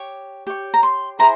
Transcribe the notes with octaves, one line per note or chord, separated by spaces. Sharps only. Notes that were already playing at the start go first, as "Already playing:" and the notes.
Already playing: G4 C#5 C#6
G4 C#5
A#5
C6
E4 G#4 C5 A#5